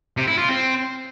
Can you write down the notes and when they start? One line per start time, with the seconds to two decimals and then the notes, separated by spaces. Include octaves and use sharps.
0.17 C3
0.28 E4
0.38 F4
0.49 C4